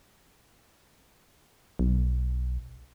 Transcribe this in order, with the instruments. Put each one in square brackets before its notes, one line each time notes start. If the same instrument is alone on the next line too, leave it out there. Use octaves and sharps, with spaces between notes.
[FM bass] B1